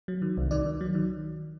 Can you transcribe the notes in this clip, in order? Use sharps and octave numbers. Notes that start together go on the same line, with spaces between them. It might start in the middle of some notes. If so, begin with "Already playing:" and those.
F#3
D#3
C2
D#3 D5
D#3
F#3
D#3